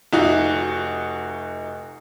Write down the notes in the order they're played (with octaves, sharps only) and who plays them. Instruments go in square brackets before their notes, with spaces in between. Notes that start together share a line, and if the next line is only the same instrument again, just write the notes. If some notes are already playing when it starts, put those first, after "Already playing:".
[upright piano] F1 D#4 F#4 E5